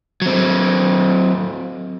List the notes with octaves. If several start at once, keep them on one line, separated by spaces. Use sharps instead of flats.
F#3 C4